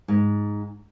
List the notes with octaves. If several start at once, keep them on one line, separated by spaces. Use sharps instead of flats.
G#2